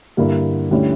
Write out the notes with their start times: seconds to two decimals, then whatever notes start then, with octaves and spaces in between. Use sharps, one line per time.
0.17 G2 D3 A#3 E4
0.71 D2 D3 G3 C#4 E4